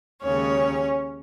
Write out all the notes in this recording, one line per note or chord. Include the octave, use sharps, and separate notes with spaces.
D#2 C#3 G#3 C#4 C#5